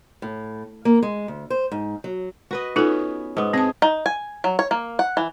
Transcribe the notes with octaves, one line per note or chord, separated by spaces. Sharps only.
A2
A#3
G#3
D2
C5
G#2
F#3
F#4 B4 D#5
B3 C#4 D#4 F4 A4
G#2 B3
C4 G#4 A5
D#4
G#5
F#3
C#5
A#3
F#5
E3